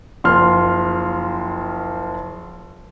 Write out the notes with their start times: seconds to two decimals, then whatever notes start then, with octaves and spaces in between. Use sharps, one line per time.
0.24 F#1 F3 C6 F6